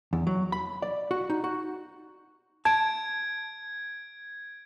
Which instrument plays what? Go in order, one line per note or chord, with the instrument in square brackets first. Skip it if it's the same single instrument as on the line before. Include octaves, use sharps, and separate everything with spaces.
[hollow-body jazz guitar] E2
F#3
B5
D5
F#4
D#4
F#4
[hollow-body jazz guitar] A5 [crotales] G#6 D7